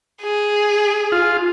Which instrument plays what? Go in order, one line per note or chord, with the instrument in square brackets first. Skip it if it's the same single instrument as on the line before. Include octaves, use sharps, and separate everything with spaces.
[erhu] G#4
[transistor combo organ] F4